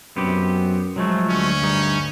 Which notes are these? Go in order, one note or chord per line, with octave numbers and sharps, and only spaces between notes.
F#2 B3 C4 G4
F3 F#3 G#3 A3
D2 C#4
G2 D#4